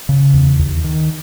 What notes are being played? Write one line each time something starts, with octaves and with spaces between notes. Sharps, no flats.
C#3
E2
D#2
D#3